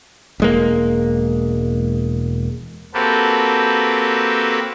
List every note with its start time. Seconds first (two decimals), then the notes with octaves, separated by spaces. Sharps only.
0.40 E1 G#3 A#3
2.94 A#3 C4 F#4 G4 A4 B4